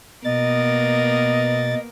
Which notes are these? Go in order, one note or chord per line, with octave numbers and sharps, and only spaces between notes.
B2 A#3 B3 A#4 D#5 A6